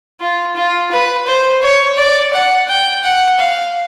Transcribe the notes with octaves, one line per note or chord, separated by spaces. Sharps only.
F4
F4
B4
C5
C#5
D5
F#5
G5
F#5
F5